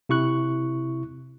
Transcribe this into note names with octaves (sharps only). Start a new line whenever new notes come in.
C3 E4 C#6 F#6